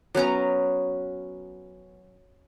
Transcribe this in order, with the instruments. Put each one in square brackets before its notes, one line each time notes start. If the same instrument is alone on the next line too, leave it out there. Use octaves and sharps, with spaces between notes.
[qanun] F#3 B3 C#4 A#5